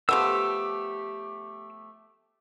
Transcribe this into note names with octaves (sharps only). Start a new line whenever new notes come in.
F3 A3 B3 G4 E6